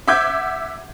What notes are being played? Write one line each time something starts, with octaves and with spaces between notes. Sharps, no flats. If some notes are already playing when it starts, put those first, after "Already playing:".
E5 F#5 D6 G6 G#6